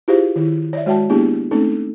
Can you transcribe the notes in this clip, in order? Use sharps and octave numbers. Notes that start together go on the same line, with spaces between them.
E4 F4 G4 G#4 C5 F5
D#3 E4
C#5 D5 E5
G#3 F#4 C#5 E5 G5 A5
A#3 B3 D4 E4 G4 G#4
A3 C4 C#4 D#4 A4